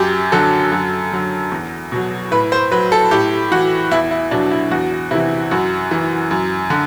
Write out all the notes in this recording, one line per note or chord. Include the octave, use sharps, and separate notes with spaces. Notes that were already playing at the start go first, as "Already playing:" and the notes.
Already playing: F#2 G4
D3 F#3 A4
F#2
D3 F#3
E2
B2 F#3
A2 B4
C5
F#3 B4
A4
A2 G4
E3 F#4
E2 E4
E4
B2 F#3 D4
E4
E2 F#4
C3 E3 E4
F#2 F#4
E3
F#2
D3